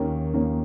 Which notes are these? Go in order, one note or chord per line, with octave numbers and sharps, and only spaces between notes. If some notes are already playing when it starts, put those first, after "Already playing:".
Already playing: D#2 D#3 A#3 C#4
D#2 D#3 A#3 C#4